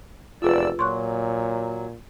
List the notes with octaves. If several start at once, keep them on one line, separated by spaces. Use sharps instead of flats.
F1 E2 F4 G#4 B4 D5 E6
A#2 F#3 C6 C#6 F#6